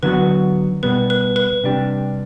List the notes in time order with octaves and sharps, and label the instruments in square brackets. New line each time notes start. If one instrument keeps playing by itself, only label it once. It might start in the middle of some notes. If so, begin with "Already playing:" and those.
[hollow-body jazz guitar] D3 F#3 B3 F#4 [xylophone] B4
[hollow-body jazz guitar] B2 G3 B3 [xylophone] B4
[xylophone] B4
B4
[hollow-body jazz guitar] C3 G3 D4 G4